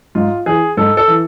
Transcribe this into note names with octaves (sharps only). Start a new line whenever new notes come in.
G#2 F4
E3 G#4
G#2 A4
A4
E3